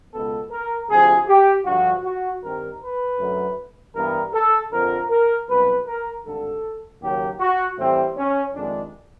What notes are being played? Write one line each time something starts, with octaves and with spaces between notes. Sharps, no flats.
C#2 B2 G#3 B3 A4
A#4
D2 C3 F3 G#4
G4
G2 D3 F3 F#4
F#4
G2 D#3 G3 C4 A#4
B4
F#2 D3 F#3 A3
G2 E3 G3 B3 A#4
A4
F2 D3 F3 A#4
A#4
C2 B2 F#3 B4
A#4
G#1 G2 D3 A4
D#2 C#3 F#3 A#3 G4
F#4
A2 E3 G3 C4
C#4
F2 C3 D#3 G#3 D4